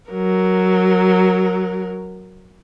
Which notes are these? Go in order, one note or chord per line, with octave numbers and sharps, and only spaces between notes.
F#3 A#4